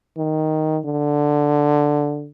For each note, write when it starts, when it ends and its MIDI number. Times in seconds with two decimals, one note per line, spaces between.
0.17 0.80 51
0.85 2.29 50